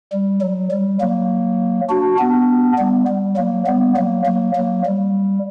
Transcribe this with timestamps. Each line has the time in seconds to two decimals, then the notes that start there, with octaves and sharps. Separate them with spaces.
0.12 G3
0.42 F#3
0.71 G3
1.00 F#3 A#3
1.89 D4 F#4
2.18 B3 D4
2.78 G3 B3
3.07 G3
3.37 F#3 A#3
3.67 G3 B3
3.96 F#3 A#3
4.26 F#3 A#3
4.55 F#3 A#3
4.85 G3